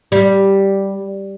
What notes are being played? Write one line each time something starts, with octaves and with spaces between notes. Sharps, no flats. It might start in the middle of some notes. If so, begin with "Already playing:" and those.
G3